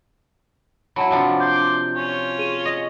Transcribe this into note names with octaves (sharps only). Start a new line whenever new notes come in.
F#3 E4 F#5 A5 B5
C3 F3 D4
C6 D6 G6
C#4 F4
G#4 D#7
D#5